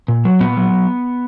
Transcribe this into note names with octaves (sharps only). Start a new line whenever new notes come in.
A#2
F#3
A#2 B3
F#3